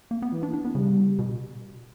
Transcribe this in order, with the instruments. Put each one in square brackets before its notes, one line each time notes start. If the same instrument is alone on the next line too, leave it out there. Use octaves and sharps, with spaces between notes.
[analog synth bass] A#3
B3
[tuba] E3
[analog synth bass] D4
D4
B3
[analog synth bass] C#3 [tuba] G3
[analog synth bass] B2